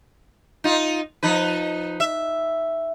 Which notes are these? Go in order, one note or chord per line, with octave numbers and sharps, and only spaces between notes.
D#4 F4
F3 D#4 B4
E5